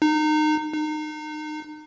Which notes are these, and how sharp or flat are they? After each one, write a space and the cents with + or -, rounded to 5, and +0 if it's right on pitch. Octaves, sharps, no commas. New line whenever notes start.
D#4 -25
D#4 -30